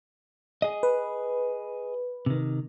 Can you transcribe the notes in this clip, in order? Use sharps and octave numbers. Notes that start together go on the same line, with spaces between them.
G#4 D#5
B4
C3 D#3